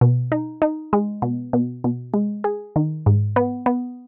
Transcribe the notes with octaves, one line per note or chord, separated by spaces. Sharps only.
B2
D#4
D#4
G#3
B2
B2
B2
G#3
G#4
D#3
G#2
B3
B3